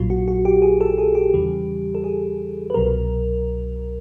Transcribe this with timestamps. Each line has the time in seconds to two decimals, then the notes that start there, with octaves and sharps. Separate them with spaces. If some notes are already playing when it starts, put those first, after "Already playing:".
Already playing: A#1 A#2 F#3 F4
0.10 F#4
0.28 F#4
0.45 G4
0.62 G#4
0.81 A4
0.98 G#4
1.15 G4
1.34 E2 C#3 E3 G3
1.95 A4
2.04 G#4
2.70 B4
2.74 C2 B2 F#3 A#4